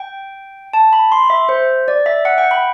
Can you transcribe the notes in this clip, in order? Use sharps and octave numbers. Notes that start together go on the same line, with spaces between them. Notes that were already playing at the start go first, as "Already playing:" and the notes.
Already playing: G5
A5
B5
C6
E5
C5
D5
E5
F#5
G5
B5